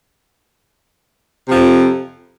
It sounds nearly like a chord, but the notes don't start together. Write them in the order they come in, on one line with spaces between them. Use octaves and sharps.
C3 F3 F2